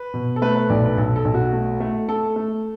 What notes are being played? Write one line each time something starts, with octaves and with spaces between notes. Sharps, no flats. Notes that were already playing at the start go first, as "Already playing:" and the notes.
Already playing: B4
B2
A4
A3 B4
B4
B1 D5
B4
B1 A4
A4
B1
F#4
A3
A3
A3 A4
A3